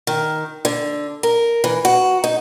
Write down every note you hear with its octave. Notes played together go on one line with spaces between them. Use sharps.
D#3
D3
A#4
E3
F#4
D#4